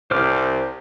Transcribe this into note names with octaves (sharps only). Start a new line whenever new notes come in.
C2 C5 D6 F6